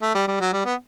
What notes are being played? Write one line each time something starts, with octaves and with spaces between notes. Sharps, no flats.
A3
G3
G3
F#3
G3
B3